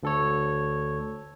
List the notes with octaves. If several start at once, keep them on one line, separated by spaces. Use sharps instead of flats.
D2 A4 C#5